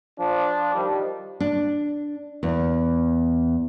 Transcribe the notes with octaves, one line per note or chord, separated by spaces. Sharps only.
F3 D4
D#3 F3 G3
D4
E2